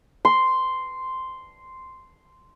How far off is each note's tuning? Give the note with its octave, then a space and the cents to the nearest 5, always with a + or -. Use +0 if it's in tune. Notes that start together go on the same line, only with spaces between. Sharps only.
C6 -5